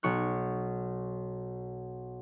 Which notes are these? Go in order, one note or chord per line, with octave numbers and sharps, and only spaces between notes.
B1 C#6 F#6